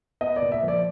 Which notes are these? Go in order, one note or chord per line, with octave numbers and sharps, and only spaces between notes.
B3 D#5
D5
A#2
E5
F3 D5